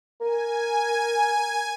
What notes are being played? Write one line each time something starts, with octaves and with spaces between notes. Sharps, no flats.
A#4 G#5